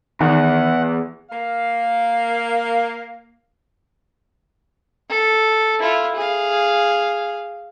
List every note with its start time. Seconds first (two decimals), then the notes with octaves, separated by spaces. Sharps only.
0.21 E2 D#3 F#5
1.30 A#3 F5
5.10 A4
5.80 E4 F4
6.16 G#4 F5